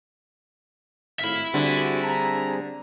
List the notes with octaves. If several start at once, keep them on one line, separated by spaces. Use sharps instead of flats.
G#1 A2 E5 F5 B5
D3 G3 C4 D4 F#4 G#4
A5 A#5